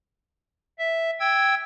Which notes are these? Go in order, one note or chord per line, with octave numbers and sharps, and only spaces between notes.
E5
G5 E6 G#6